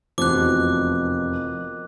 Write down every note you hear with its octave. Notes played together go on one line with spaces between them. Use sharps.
F1 E2 B2 D#3 F3 D6 F#6